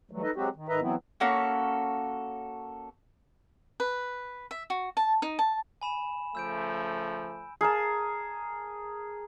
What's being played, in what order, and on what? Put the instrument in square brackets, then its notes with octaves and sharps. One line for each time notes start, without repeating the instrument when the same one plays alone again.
[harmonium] E3 F#3 G3 A3
D#4 A4 B4 D#5
F#3 G#3 C4 F#4 G4
D#3
G#2 D#3 B4 D#5 E5 A#5
E3 F#3 B3 C4 E4
[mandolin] A#3 C#4 F#4 A4
[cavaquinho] B4
E5
F#4
A5
D#4
A5
[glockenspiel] G#5 B5 E7
[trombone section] C#3 F3 A3 [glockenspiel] E6 G6 D7
[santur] G#4 A#4 A5